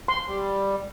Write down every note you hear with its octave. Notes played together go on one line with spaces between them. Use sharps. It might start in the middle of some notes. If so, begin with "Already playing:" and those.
C6
G3